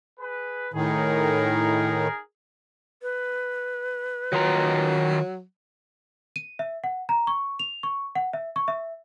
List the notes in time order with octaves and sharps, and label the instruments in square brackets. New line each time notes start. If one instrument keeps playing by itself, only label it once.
[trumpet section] G#4 B4
[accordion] A2 D#3 [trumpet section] D#4 G#4 A#4
[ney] B4
[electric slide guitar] D#3 F4 A#5 [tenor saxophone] F#3
[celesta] D#7
E5
F#5
A#5
C#6
F7
C#6
F#5
E5
C#6
E5